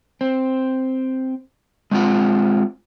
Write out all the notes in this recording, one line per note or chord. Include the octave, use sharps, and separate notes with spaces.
C4
G#3 C4 F4 F#5